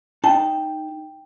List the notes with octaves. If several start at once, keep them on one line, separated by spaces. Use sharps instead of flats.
D#4 G5 A5